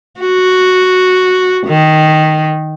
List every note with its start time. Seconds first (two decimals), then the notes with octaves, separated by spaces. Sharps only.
0.20 F#4
1.67 D#3